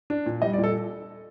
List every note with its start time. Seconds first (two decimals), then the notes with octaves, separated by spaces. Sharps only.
0.10 D4
0.26 A#2
0.42 G3 D#5
0.53 D5
0.58 A#2
0.64 A4